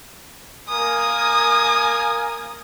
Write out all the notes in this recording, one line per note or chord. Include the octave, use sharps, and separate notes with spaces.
A#3 A#4 G#5 D#6